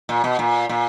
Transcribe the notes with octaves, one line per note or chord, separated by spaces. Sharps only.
A#2
B2
A#2
A#2